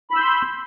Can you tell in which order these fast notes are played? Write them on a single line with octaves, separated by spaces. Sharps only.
B5 E6 G6 C6